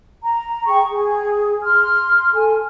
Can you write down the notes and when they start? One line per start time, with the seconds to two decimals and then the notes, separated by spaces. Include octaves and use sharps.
0.22 A#5
0.67 G#4 G5 C#6
0.91 G#4
1.64 C6 F6
2.34 A4 G#5